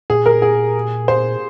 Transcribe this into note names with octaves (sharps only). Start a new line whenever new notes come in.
A#2 G#4
A#4
G#4
C5